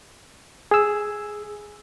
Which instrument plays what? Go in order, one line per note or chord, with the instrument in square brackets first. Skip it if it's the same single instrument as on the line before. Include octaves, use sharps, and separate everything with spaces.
[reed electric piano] G#4 E6